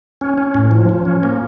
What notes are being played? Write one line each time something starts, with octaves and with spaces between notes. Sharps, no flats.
C#4
C#4
A2
F3
F3
C#4
A#3